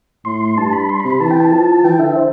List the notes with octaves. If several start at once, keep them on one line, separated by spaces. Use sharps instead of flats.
A2 C6
G2 A5
B5
C6
B5
C3
B5
E3 A5
G5
A5
F3
E3 G5
D3 E5
C5